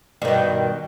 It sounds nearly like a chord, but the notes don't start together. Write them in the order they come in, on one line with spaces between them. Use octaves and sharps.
G2 D#3 B2